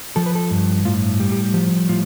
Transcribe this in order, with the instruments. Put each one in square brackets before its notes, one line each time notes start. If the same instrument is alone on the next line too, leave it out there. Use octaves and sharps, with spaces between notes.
[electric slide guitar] F3 A4
B4
A4
G2
A2 F4
G3
G4
F3 G4
A2 F4